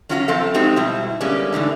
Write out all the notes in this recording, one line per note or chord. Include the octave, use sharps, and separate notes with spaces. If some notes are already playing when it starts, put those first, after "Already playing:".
F#3 C#4 F4 F#4 C5 A#5
F#2 F3 C4 A4 F5
G#3 C4 D#4 F#4 G4
B2 G3 E4
D3 G3 G#3 A#3 B3 C#4
A2 D3 E3 D#4